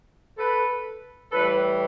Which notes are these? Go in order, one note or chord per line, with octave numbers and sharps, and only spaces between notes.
A4 B4
A2 E3 G3 A4 B4